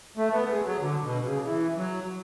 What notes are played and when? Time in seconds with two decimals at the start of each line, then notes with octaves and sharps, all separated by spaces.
0.17 A3
0.33 B3
0.50 G#3
0.66 F#3
0.81 D3
1.03 B2
1.24 C#3
1.45 E3
1.77 F#3